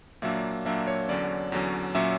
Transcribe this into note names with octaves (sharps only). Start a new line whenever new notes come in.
A#2 F#3 A#3 D4 E5
A#2 F#3 A#3 D4 E5
C#5
E2 D3 F#3 C#4 D5
E2 D3 F#3 C#4
A#2 F#3 C#4 E5